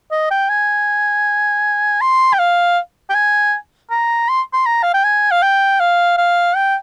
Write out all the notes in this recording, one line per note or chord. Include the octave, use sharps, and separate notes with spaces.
D#5
G5
G#5
C6
G5
F5
G5
G#5
A#5
C6
C6
A#5
F5
G5
G#5
F5
G5
F5
F5
G5